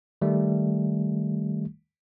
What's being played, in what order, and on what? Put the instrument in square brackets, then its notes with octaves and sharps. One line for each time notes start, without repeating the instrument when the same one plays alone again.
[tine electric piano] D#3 G3 A3